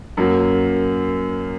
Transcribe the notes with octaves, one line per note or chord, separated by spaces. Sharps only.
F#2 F#3 A#3